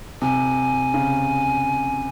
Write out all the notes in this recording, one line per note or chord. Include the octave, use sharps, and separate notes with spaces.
C3 G#5
C#3